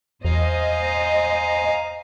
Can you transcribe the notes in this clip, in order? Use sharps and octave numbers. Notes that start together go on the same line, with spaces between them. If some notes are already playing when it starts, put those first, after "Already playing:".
E2 C5 D#5 F5 G#5 A#5